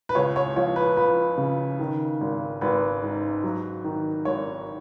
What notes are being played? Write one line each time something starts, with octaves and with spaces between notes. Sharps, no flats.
B4
C#2 C#5
C#5
F3 C#5
B4
F3 B4
C#3
D#3
G#1
G#1 B4
G#2
F#3
D#3
G#1 C#5